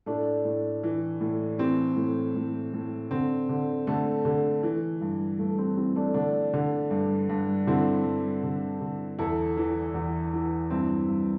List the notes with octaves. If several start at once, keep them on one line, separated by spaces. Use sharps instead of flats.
A2 A3 D4
A2
E3
A2
E3 C4
A2
A2
A2
D3 C4
D3
D3 A3
D3
E3
G2
G2 A3
C4
E3 C4
A3 D4
D3 A3 D4
D3
G2
G2
D3 C4 E4
G2
D3
D3
E2 E4 A4
E3
E2
E3
G2 C4 E4
G2